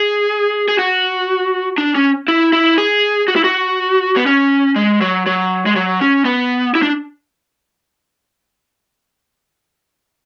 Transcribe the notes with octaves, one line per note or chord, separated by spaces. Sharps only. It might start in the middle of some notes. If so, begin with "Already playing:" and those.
Already playing: G#4
G#4
F#4
D4
C#4
E4
E4
G#4
F#4
E4
F#4
B3
C#4
G#3
F#3
F#3
G#3
F#3
C#4
B3
E4
D4